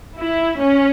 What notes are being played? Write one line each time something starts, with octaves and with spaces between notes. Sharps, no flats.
E4
C#4